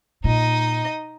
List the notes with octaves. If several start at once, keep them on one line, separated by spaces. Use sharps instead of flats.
A#2 D#4 D#5